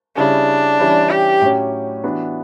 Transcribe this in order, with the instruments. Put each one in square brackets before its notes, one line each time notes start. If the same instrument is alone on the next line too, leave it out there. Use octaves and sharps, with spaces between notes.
[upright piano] C#3 G3 C#4 E4 [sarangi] D4
[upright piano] E3 G3 C#4 E4
[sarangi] G4
[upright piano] A2 F#3 C#4
E3 B3 D4 F#4